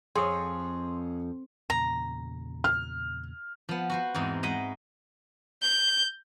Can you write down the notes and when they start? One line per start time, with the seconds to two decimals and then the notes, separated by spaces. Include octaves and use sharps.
0.16 F2 G#4 C#5 C6
1.70 E2 A#2 C#3 A#5
2.64 F6
3.69 F3 B3
3.90 F#4 B4 C5
4.14 E2 G#2 C4 D#4
4.43 G#3 D#5 F#5 B5
5.62 G6